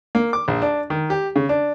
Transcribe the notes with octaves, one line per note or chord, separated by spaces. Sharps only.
A#3
D6
A#1
D4
D#3
G4
C#3
D4